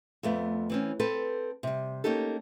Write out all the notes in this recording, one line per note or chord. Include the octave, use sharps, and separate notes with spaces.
F2 A3 B3
E3 C4 C#4
C4 A4 B4
C3 G3
A#3 C#4 D#4 G4 A4